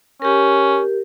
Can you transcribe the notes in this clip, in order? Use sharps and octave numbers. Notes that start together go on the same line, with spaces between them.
C#4 G4 A#4